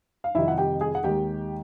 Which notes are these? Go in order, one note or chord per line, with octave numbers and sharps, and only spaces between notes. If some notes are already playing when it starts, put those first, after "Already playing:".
F5
F2 C3 D#3 G3 E4 E5
F#5
G4 G5
G#4 G#5
F#5
D#2 D#3 G#3 G4 G5